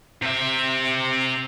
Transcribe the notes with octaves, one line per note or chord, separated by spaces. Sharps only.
C3 E5